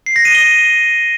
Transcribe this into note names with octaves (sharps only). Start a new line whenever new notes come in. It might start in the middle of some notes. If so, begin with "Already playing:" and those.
C7
A#6
D#7
G7